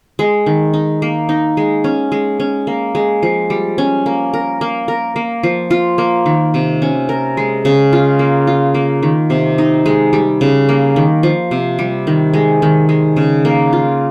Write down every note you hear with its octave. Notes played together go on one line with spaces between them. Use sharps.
G#3
D#3
D#4
A#3
D#4
G#3
C#4
G#3
C#4
A#3
G#3
F3
G3
C#4
A#3
A#4
A#3
A#4
A#3
F3
F4
A#3
D#3
C3
C#4
A#4
G#3
C#3
F4
A#3
F4
A#3
D#3
C3
D#4
G#3
G3
C#3
A#3
D#3
F3
C3
G3
D#3
G#3
D#3
G#3
C#3
A#3
F4